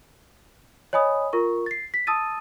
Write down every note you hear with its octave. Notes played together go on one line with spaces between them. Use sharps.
C#5 D#5 G#5 B5 D#6
F4 A#4 C#6
A6 C7
B6
A5 D#6 E6 A6 D#7